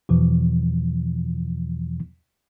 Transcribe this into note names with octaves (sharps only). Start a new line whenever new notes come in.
E2 B2 E3 F3